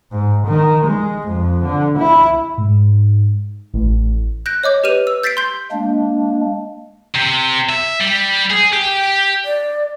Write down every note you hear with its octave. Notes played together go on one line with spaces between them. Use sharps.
G#2
D#3
G#3
F2
D3
E4
G#2
A1
F#6 G6 A#6 D7
C#5 D#5 D6 G6
G4 B4 F6 D#7 F7
E6
G6 A6 B6 C7 D7
C6 G6
G#3 A#3 D4
C3
E5
G3
G#4
G4
D5